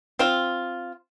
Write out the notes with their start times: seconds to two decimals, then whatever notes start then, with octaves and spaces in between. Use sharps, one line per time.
0.19 C4 F4